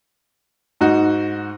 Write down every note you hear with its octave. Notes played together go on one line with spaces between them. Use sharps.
G#2 D#4 F#4